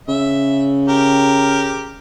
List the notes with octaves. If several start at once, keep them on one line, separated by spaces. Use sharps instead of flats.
C#3 E5
G4 A#4